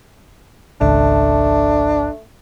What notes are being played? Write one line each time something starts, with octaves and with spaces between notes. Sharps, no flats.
G#1 C#2 A3 D4